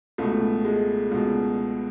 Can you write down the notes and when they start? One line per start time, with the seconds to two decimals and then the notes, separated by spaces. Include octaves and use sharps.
0.18 C#2 B2 A3
0.65 G#3
1.11 C#2 B2